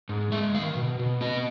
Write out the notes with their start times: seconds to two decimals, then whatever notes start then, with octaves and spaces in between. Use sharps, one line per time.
0.09 G#2
0.32 G#3 E5
0.54 D#3 F5
0.76 B2
0.99 B2
1.21 B3 D#5